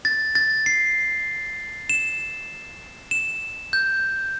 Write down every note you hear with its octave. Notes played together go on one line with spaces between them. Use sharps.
A6
A6
C7
E7
E7
G6